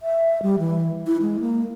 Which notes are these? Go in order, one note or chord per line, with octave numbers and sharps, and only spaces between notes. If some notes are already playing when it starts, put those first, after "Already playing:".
E5
G3
E3
E4
G#3
A#3